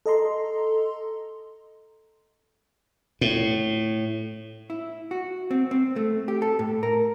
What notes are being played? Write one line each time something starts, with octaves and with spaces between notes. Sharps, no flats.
A4 D#5 A#5 C6
A2
E4
F#4
C4
C4
A3
G4
A4
A2
A#4